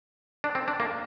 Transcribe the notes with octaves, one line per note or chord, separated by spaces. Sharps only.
D4
C4
D4
A#3